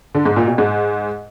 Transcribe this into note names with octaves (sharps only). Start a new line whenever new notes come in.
D3
G#2
A#2
B2
G#2